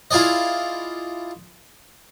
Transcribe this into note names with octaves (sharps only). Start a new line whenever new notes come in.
E4 F4 G#4 D5 D#5